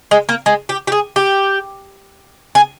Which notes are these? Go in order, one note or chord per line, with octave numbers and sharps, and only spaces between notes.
G#3
A#3
G#3
G4
G4
G#4
G4
G#4